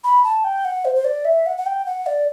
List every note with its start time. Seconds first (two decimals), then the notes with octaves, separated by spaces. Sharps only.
0.04 B5
0.24 A5
0.44 G5
0.65 F#5
0.85 C5
0.95 C5
1.05 D5
1.25 E5
1.46 F#5
1.58 F#5
1.66 G5
1.86 F#5
2.06 D5